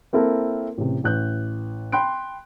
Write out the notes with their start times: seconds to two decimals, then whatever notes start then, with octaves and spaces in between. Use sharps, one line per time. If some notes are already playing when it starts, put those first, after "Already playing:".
0.13 A#3 C4 E4 A4 A#4
0.78 A1 C3
1.04 A1 F#6 G6
1.92 G5 B5 C6 F#6 D7